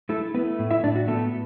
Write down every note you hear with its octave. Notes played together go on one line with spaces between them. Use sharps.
A3 E4 A4
A3 B3 B4
A2
E4 E5
A2 D4 D5
F#4
A3 B3 A4